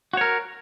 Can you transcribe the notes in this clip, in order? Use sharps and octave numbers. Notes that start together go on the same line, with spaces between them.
F#4 A#4 C#5